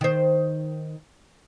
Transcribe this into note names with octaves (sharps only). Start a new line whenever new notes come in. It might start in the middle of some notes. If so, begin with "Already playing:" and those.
D#3 C5